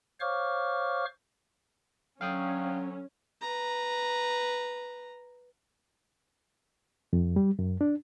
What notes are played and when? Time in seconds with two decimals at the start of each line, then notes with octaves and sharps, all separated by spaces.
0.20 C5 C#5 F5 C#6 D6 F6
2.21 D3 F#3 C#4 F5 G5 D#6
3.41 B4 A#5
7.13 F2
7.36 G3
7.59 F#2
7.81 D4